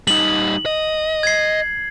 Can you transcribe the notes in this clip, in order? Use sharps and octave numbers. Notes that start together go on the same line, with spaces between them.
G3 D#4 F#7
D#5
G#6 C7